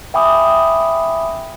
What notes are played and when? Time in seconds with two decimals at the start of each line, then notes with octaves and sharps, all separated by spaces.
0.14 E5 G5 G#5 B5 D6 D#6